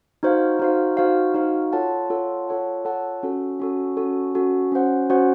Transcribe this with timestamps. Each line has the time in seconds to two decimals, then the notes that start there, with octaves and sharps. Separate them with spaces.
0.23 D#4 F#4 C5 F5
0.60 D#4 F#4 C5 F5
0.97 D#4 F#4 C5 F5
1.34 D#4 F#4 C5 F5
1.72 F4 A4 C#5 F#5 A5
2.10 F4 A4 C#5 F#5 A5
2.48 F4 A4 C#5 F#5 A5
2.85 F4 A4 C#5 F#5 A5
3.23 C#4 F#4 A4
3.60 C#4 F#4 A4
3.97 C#4 F#4 A4
4.35 C#4 F#4 A4
4.72 C#4 F#4 C5 F#5
5.10 C#4 F#4 C5 F#5